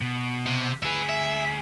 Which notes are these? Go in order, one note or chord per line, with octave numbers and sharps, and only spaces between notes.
B2
C3
D2 G#4 B4 E5
E5